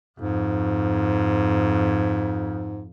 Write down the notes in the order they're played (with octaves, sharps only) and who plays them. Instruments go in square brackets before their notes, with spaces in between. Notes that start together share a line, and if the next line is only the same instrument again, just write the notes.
[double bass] F2 [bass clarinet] G#2